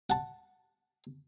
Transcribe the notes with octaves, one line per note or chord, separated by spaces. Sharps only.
F#5 A5